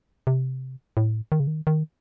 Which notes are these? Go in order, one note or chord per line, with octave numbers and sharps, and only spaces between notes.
C3
A2
D#3
C#3
D#3
D#3